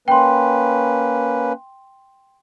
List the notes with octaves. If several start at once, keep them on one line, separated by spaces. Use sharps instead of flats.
A#3 C#4 B4 G5 C6